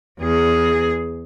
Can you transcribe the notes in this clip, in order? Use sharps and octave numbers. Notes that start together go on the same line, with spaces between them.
E2 G#4